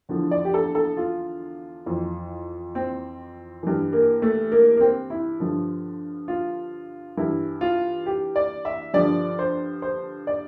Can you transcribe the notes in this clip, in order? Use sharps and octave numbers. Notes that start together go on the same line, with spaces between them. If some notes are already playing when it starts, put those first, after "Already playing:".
E2 D3 F3
D5
G4
A4
A4
F4
F2 E3
C4
G2 E3
A#3
A3
A#3
A#3
C4
E4
G2 D3 F3
F4
G2 E3 E4
F4
G4
D5
E5
G2 D3 F3 D5
C5
C5
D5